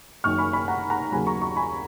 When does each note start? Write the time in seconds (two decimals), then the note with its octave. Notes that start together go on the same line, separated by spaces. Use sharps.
0.24 F#1 F#2 D#3 C#6 F6
0.38 G#5 B5
0.53 G#5 B5
0.68 F#5 A#5
0.90 F#5 A#5
1.12 D#2 C#3 F#3 G#5 B5
1.27 A#5 C#6
1.41 A#5 C#6
1.56 G#5 B5